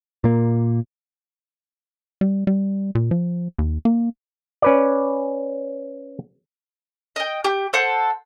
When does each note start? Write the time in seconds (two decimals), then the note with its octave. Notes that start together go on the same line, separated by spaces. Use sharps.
0.24 A#2 A#3
2.21 G3
2.47 G3
2.95 A#2
3.11 F3
3.59 D#2
3.85 A#3
4.62 C#4 B4 D5
7.16 D#5 G5
7.44 G4 G6
7.73 A4 C5 F#5